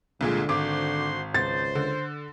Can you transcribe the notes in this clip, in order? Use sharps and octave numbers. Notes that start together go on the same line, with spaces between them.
C2 A#2 D3 G#3
G#1 F#4 C5 C6 D6
C#2 C5 A6
D3